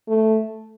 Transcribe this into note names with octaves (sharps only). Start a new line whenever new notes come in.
A3